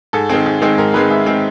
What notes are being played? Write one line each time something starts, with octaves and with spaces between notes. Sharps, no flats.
G#2 A4
D#3 G#3 C4 G#4
G#2
D#3 G#3 C4
G#2 A#4
D#3 G#3 C4 B4
G#2 E5
D#3 G#3 C4